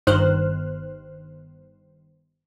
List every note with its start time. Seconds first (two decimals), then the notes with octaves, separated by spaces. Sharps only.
0.07 G1 G2 D#3 C5 F6 F#6